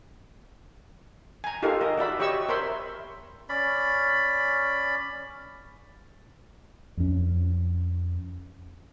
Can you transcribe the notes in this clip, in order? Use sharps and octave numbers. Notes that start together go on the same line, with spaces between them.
G#5 A#5
D#4 F4 G4 A4 A#4 F5
A#4 D#5
F#4 D5 E5 B5
G4 C#5 D#5 C#6 E6
A#4 C5 C#5 E5 B5 C6
C#4 D5 B5
F2 C#4